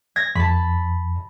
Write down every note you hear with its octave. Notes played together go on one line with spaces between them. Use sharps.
G#6 A#6
F2 A5 B5